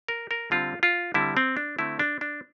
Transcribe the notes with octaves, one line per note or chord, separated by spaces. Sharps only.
A#4
A#4
D3 G3 C4 F4
F4
D3 G3 C4 E4
C4
D4
D3 A3 C4 E4
D4
D4